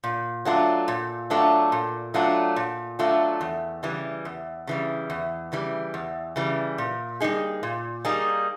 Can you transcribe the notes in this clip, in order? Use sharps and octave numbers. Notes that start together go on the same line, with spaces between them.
A#2
F#3 A3 D4 F4
A#2
F#3 A3 D4 F4
A#2
F#3 A3 D4 F4
A#2
F#3 A3 D4 F4
E2
C#3 E3 G3
E2
C#3 E3 G3
E2
C#3 E3 G3
E2
C#3 E3 G3
A#2
G3 A#3 D#4 G#4
A#2
G3 A#3 D#4 G#4